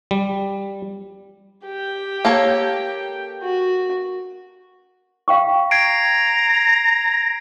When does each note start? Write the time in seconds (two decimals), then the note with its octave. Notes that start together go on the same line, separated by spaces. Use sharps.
0.11 G3
1.65 G4 G5
2.25 A#3 A4 C#5
3.43 F#4
5.28 F5 G5 C#6
5.71 A#5 G#6 C7 D7